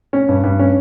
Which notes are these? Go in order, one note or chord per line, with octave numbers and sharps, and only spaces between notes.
C#4
G2
G2
C#4